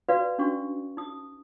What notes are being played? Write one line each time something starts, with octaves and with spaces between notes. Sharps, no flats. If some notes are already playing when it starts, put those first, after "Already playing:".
F#4 B4 D5 F5
C#4 D4 F#4 C#6
D#4 D#6